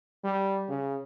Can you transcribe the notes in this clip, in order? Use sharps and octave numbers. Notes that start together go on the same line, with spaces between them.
G3
C#3